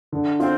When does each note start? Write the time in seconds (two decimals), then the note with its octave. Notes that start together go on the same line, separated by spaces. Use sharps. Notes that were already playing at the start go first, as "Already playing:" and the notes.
0.12 D3
0.40 C4 F4